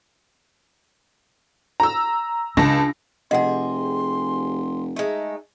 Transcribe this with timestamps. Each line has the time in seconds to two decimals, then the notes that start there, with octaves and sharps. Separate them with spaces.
1.80 A#5 E6
2.57 C#2 D4 A5 A#6
3.31 F1 C3 G#4 D#5 F#5 C6
4.96 G#3 A3 D#4